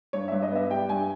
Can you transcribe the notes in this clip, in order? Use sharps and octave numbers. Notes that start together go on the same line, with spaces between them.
G2 C#5
G2 E5
D#5
B3 E5
G3 G5
G2 G#5